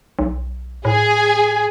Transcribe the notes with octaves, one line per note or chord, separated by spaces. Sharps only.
B1
A2 G#4 G#5